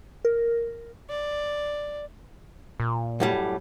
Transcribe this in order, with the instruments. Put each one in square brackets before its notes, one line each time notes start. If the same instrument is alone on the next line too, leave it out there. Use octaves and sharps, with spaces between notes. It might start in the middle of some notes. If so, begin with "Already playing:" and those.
[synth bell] A#4
[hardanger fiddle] D5
[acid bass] A#2
[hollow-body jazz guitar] F#2 A2 G3